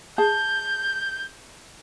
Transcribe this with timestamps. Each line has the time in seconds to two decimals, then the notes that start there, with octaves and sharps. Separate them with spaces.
0.18 G#4 A5 G6